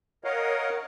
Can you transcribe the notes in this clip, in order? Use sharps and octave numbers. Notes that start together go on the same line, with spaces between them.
A#4 C#5 D#5 F5 F#5